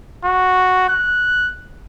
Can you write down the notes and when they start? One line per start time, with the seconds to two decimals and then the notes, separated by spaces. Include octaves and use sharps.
0.25 F#4
0.89 F#6